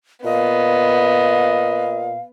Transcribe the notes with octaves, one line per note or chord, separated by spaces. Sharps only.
A#2 B3 D#5 F5